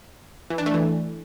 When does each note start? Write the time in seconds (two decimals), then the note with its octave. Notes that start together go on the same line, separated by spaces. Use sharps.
0.50 E3
0.58 D4
0.66 A3
0.74 E3